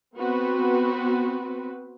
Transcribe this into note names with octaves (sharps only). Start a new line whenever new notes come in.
B3 C4 F#4 B4